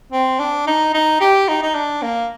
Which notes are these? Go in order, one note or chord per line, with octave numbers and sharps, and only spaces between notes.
C4
D4
D#4
D#4
G4
D#4
D#4
D4
A#3